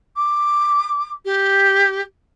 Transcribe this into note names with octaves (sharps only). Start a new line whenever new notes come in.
D6
G4